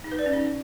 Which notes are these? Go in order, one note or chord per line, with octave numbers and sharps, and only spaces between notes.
D#4
B4
D5
C#4
D#4